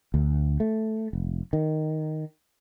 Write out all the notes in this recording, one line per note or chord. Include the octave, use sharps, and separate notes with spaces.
D2
A3
F1
D#3